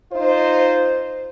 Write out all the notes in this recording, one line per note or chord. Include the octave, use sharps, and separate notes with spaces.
D#4 F4 C5